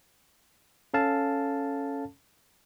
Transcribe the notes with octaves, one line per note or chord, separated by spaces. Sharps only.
C#4 A4 F5 A5